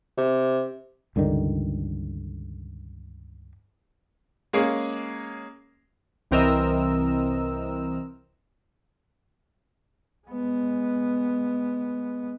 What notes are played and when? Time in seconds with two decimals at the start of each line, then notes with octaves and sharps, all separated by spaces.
0.17 C3
1.16 C#2 G2 D3 D#3
4.53 G#3 A#3 C#4 G#4
6.31 C2 E3 C4 A#4 D#5 E6
10.28 G#3 B3